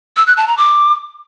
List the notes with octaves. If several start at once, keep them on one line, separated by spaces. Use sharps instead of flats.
E6
F#6
A5
A#5
D6